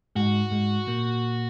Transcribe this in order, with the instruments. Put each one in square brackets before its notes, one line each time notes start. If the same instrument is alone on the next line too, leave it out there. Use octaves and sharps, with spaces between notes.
[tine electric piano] G#2 G#3 [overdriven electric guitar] F#4
[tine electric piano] G#2 G#3
A#2 A#3